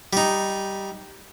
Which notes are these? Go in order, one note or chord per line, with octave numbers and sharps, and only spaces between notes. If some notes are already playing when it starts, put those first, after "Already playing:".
G3 D#4